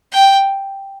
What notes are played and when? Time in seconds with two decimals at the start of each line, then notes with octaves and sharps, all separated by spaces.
0.13 G5